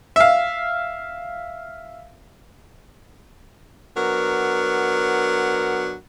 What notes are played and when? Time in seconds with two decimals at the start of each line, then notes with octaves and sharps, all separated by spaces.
0.16 E5 F5
3.96 F#3 B3 D4 A#4